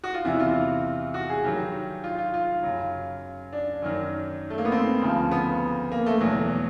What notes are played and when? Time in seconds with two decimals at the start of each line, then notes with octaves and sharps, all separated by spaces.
0.04 F#4
0.14 F4
0.25 E2 C3 E3 E4
0.40 F4
1.14 F#4
1.30 G#4
1.44 G2 D#3 F#3 G4
2.04 F4
2.18 F4
2.34 F4
2.63 F#2 C#3 F#3
3.53 D4
3.82 F#2 D#3 F#3
4.50 A3
4.58 A#3
4.65 B3
4.72 C4
5.01 D2 C#3 F3
5.31 B3
5.92 A#3
6.06 A3
6.21 E2 B2 F#3